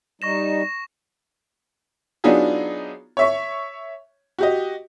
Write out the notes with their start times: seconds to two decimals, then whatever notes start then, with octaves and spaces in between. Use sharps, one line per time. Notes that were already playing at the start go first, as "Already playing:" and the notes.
0.22 G3 D#4 C#6 A#6 E7
2.24 F#3 B3 D4 D#4 F4 G#4
3.17 C#5 E5 C#6
4.38 F#4 G4 D#5